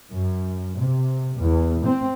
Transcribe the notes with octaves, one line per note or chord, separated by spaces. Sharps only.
F#2
C3
E2
C4